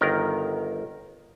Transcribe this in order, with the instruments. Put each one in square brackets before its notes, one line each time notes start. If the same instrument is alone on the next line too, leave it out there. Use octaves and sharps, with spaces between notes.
[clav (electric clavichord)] G1 D#3 A#4